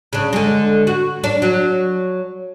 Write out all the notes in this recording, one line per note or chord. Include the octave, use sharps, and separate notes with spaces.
C#3 D4
D3 G#3
F#4
D4
F#3